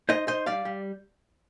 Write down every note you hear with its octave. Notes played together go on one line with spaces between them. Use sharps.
D#4 C5 D#5
D#4 C5 D#5
G3 D5 F5
G3